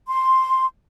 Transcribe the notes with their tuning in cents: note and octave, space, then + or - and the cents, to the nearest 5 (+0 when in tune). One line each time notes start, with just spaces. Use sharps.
C6 +5